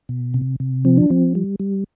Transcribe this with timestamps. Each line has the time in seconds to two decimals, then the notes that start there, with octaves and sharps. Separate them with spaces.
0.09 B2
0.34 C3
0.60 C3
0.85 F3 C4
0.97 D4
1.10 F3 C4
1.35 G3
1.60 G3